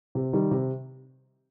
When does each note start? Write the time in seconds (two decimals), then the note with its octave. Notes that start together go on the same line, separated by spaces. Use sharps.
0.15 C3
0.33 D#3 G3
0.51 C3